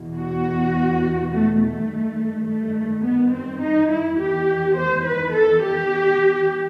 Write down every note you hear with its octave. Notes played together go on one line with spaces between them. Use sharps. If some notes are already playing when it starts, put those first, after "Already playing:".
Already playing: E2 B2
F#4
A3
A3
G2 D#3
A3
B3
C4
D#4
E4
E2 D#3 G4
C5
B4
A4
G4